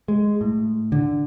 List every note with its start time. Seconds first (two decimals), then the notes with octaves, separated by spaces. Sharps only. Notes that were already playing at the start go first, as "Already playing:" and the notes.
0.08 G#3
0.41 A2
0.92 D3